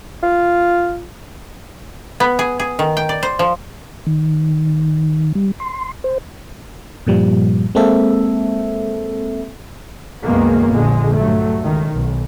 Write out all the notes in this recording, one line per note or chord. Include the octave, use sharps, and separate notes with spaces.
F4
B3
G#4
G#4
D#3
G5
D5
C5
F3
D#3
G3
C6
C5
G2 A#2 F3 G3
G#3 A#3 C4 A4 E5
C2 F#2 D#3 G#3 A#3 B3
A#1 D3 G#3
G2 F#3 A3
C#2 D#3
B1